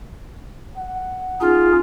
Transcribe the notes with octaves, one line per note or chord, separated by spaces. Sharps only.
F#5
C#4 D#4 F4 G#4